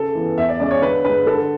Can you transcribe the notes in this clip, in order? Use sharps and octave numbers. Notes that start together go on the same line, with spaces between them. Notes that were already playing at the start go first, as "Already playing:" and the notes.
Already playing: C#3 A4
E3 B3
E2 E5
D5
C#3 G#3 C#4 D5
C#5
D3 B4
G#3 D4 B4
D3 A4